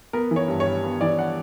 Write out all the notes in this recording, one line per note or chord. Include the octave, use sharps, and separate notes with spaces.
B3 A#4
E3
C#5
G2
C#5
G3
B3
E3 D5
F#5